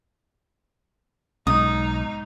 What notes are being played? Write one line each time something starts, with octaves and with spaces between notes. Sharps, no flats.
B1 G#2 D#4 D#6